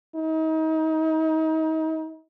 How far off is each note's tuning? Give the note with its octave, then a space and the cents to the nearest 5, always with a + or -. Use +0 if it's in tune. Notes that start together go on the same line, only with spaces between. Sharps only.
D#4 +35